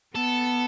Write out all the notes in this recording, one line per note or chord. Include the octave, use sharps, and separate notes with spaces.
B3 A4